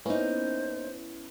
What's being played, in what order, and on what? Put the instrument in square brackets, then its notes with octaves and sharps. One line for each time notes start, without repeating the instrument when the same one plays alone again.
[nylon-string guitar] A#3 D#4 [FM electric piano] B3 C#4 E4 [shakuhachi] C5